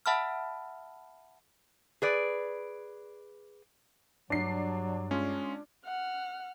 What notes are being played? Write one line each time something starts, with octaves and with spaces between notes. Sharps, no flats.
E5 F#5 A5 B5 E6 F6
G#4 B4 D5
G2 F#3 D4 C7
G#3 C#4 F4
F#5 F6